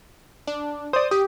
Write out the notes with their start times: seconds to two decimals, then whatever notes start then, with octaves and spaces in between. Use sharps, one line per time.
0.47 D4
0.93 C5 D5 D#6
1.11 G4 D#6